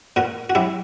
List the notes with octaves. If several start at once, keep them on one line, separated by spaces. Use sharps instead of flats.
A#2 F#4 A#4
F#4
F#3 E4 G4